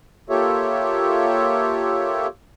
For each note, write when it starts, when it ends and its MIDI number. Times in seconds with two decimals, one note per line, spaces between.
0.30 2.27 58
0.30 2.27 65
0.30 2.27 67
0.30 2.27 69
0.30 2.27 73
0.30 2.27 76